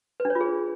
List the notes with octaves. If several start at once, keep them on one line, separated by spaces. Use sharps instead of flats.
B4
D4
C#5
F4
G#4